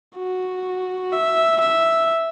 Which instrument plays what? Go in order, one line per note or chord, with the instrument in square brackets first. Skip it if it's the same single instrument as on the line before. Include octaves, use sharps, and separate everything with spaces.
[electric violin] F#4
E5
E5